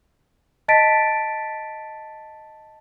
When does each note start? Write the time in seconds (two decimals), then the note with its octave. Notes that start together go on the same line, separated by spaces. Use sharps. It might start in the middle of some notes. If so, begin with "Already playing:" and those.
0.68 D#5 A5 A6 B6 D7